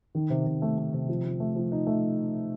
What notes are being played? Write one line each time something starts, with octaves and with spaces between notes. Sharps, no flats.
D#3
C3
C3
A3
A3
C3
F3
F3
A3
F3
D#4
A3